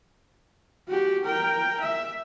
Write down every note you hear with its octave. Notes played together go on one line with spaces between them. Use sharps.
F#4 G4
A#4 G5
E5